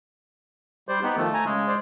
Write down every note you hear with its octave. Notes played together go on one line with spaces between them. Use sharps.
G3 C5 D5
B3 D#4 G4
D#3 F3 A3
G#5 A#5
C#3 G#3
C5 D5